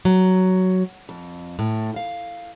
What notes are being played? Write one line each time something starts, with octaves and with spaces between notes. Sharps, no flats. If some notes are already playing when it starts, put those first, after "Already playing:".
F#3
F2
A2
F5